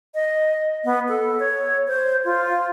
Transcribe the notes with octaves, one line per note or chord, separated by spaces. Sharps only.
D#5
B3
A4
C#5
C5
F4